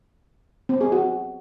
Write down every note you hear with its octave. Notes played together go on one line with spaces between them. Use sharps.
C4
G#4
F#4